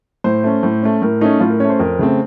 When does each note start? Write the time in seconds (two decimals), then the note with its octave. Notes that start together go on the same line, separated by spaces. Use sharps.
0.24 A2 C5
0.44 A3 C#4
0.63 A2
0.83 A3 C#4
1.02 A2 A#4
1.21 A3 C#4 D#4
1.40 A2 F4
1.50 A#4
1.60 C#4 C#5
1.64 A3
1.70 C5
1.79 F2 A#4
1.99 C#3 A3 C4